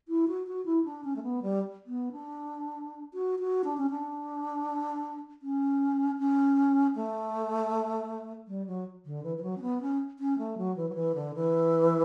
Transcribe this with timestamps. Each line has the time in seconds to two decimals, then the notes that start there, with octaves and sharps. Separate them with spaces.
0.08 E4
0.28 F#4
0.47 F#4
0.66 E4
0.85 D4
1.04 C#4
1.16 A3
1.23 B3
1.42 G3
1.87 B3
2.12 D4
3.14 F#4
3.39 F#4
3.64 D4
3.78 C#4
3.90 D4
5.42 C#4
6.19 C#4
6.96 A3
8.48 G3
8.67 F#3
9.06 D3
9.24 E3
9.37 E3
9.43 F#3
9.57 C#4
9.62 B3
9.81 C#4
10.19 C#4
10.38 A3
10.58 F#3
10.77 E3
10.89 F#3
10.95 E3
11.15 D3
11.34 E3